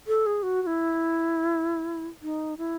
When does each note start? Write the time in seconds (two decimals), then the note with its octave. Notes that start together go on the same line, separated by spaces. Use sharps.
0.07 A4
0.26 G#4
0.43 F#4
0.62 F#4
0.67 E4
2.22 D#4
2.58 E4